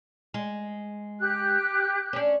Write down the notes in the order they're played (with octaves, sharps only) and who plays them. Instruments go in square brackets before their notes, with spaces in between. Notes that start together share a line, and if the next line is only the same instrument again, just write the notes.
[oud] G#3
[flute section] G4 F#6
[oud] C#4 D4